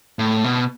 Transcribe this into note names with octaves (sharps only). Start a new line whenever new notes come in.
A2
B2